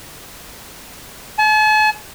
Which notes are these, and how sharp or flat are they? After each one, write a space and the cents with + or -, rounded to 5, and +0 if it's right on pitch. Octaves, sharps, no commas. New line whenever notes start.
A5 -45